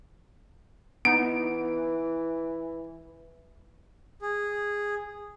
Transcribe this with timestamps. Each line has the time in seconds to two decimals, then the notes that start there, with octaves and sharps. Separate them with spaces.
1.05 E3 B3 D#4 D7
4.22 G#4